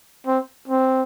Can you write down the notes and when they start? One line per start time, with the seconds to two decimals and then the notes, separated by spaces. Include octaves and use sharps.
0.27 C4
0.68 C4